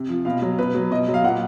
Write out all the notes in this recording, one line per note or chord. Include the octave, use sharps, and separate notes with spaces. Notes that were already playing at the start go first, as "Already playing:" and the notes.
Already playing: C3
F3
B2 F5
F#3
B2 B4
F#3
B2 D#5
F#3
F5
A#2 F#5